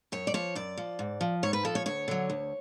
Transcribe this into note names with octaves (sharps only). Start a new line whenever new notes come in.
F#2 C#5
D5
F3 C#5
F#2 D5
F3
G#2
F3
G#2 C#5
B4
F3 A4
C#5
D2 C#5
D3 F#3
D2